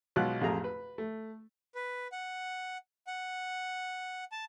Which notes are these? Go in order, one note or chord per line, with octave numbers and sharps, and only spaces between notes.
B1 B2 G#3 F4 F#6
A1 F2 A3 F4 G#4 A#5
B4
A3
B4
F#5
F#5
A5